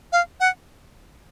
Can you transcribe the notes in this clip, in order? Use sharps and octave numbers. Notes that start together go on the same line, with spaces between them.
F5
F#5